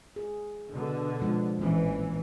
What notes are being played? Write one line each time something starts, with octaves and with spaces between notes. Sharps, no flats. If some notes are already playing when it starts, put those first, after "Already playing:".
G#4
B2 D3
F3 G#3 D4
A1 A#2 E3 C#4